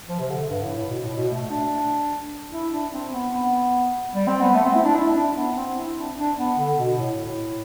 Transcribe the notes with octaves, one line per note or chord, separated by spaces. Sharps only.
F3
C3
D3
G2
A2
A2
B2
A2
B2
A3
D4
E4
D4
C4
B3
B3
G3
C4
B3
A3
C4
E4
D4
E4
D4
B3
C4
E4
D4
D4
B3
D3
B2
A2
A2